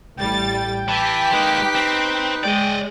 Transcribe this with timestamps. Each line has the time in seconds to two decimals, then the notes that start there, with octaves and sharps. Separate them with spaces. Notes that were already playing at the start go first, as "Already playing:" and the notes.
0.18 A1 G3 G5 A6
0.89 E3 G4 A5 B6
1.33 G#3 A#3 D#4 B4
1.75 C4
2.44 G#3 D5 D#5 G5